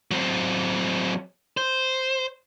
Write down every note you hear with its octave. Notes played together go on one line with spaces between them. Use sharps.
F#3 C4
C5